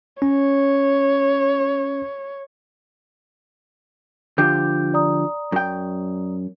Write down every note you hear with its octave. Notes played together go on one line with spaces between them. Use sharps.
C#4 C#5
D3 F3 G4 G6
D5 A#5 D#6
F#2 G5